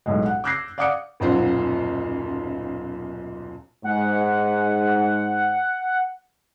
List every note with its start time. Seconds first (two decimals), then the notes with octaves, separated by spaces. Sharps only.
0.06 B1 A2 G#3
0.26 F#5
0.44 D6 E6 F#6 G6 A#6 C7
0.78 D5 F5 F#5 D6 D#6 C#7
1.20 D#1 B1 F#2 F4 C5 F#5
3.84 G#2 F#5